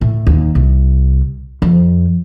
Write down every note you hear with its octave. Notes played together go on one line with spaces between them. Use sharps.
A2
D#2
C2
F2